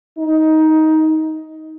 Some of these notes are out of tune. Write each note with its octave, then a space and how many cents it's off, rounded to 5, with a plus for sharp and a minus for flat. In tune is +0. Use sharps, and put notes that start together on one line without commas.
D#4 +15